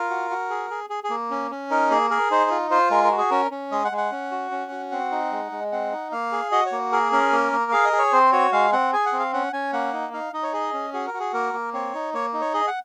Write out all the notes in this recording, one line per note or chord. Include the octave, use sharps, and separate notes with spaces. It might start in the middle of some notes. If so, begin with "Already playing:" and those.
Already playing: F4 A#4
F#4
F#4
G#4
G#4
G#4
G#4
A#3
C#4
C#4
D#4 A#4
A#3 G#4
G#4 A#4
D#4 C5
F4
F4 C5
G#3 A#4
A#4
F#4
G#4
C#4 A#4
C#4
G#3 D#5
F#5
G#3
F#5
C#4
F#4
C#4
F#4
C4 F#5
D#4
G#3
G#3
C4 F#5
D#4
A#3 F5
G#4
F#4 D#5
C#5
A#3
G#4 A#4
C#4 A#4
A#3
A#3
G#4 F5
D#5
G#4
C#5
C4 C5
F#4 C#5
G#3 F5
C4 F#5
G#4 G#5
F#5
C4
F5
C#4 F#5
C#4 G#5
A#3 F#5
D#4
D#4 F5
D#4 D#5
C#5
G#4 D#5
C#4
F#4 G#4
A#4
F#4
G#4
A#3 A#4
A#3
C4 C#5
D#4
A#3 C#5
D#4
C#5
G#4 D#5
F#5